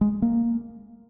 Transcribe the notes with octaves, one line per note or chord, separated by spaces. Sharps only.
G#3
A#3